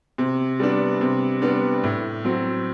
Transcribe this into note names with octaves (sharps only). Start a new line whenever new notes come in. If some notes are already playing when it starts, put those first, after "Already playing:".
C3
G3 B3 D4
C3
G3 B3 D4
A2
F#3 C4